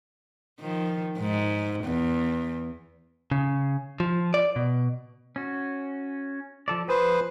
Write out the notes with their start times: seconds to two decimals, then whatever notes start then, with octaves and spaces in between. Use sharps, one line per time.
0.60 D#3 F3
1.19 G#2
1.84 E2
3.31 C#3
4.00 F3
4.34 D5
4.56 B2
5.36 C#4 F#4
6.68 F3 A4 D5
6.89 F3 G#4 B4 C5